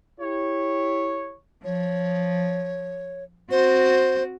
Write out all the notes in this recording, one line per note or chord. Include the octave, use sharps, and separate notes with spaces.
E4 G4 C#5
F3 C#5
C4 F#4 C5